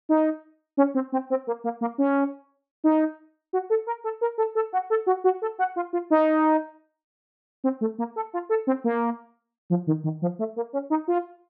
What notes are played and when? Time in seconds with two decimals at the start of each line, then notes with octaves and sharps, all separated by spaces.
0.09 D#4
0.77 C#4
0.95 C4
1.12 C4
1.30 C4
1.47 A#3
1.64 A#3
1.81 A#3
1.98 C#4
2.84 D#4
3.53 F#4
3.70 A4
3.87 A#4
4.04 A4
4.21 A#4
4.38 A4
4.55 A4
4.73 F#4
4.90 A4
5.06 F#4
5.24 F#4
5.42 A4
5.58 F#4
5.76 F4
5.93 F4
6.10 D#4
7.64 C4
7.81 A3
7.98 A#3
8.16 A4
8.33 F4
8.49 A4
8.67 C4
8.84 A#3
9.70 F3
9.87 D#3
10.04 D#3
10.22 F3
10.39 A3
10.56 A#3
10.73 C#4
10.90 D#4
11.08 F4